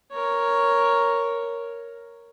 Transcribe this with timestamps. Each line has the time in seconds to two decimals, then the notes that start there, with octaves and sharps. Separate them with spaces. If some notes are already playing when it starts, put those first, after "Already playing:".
0.12 A#4 C#5